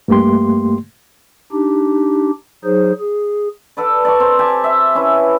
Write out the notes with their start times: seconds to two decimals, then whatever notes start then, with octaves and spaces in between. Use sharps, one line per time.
0.08 G2 A3 A#3 G4 C6
1.52 D4 D#4 G4
2.65 F#3 D#4 G#4 C5
3.00 G#4
3.77 A4 B4 D5
4.05 D5 A5 C#6
4.20 C4 A#4 C5
4.39 G4 G#5 A5
4.64 E5
4.95 C#4 E4 B4